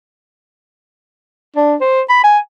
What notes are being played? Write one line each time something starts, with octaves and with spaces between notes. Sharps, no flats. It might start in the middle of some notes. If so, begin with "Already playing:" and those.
D4
C5
B5
G#5